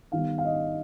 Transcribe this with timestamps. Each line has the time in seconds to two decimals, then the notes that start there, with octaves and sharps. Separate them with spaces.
0.12 D#3 G3 B3 F5
0.38 F5
0.45 D#5